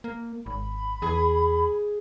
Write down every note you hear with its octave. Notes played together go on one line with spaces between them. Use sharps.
A#3
G#1 B5
E2 G#4